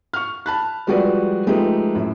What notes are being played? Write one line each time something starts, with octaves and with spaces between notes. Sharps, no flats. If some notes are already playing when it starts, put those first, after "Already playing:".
C#6 F6
A5 B5 F#6
F3 G3 G#3 F#4 B4 D5
F3 G#3 A3 D#4 G4 B4
F#2 A2